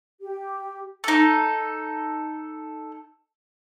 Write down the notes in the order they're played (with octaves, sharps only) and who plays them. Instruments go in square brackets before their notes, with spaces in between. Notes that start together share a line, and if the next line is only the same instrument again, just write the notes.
[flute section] G4
[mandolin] D#4 A4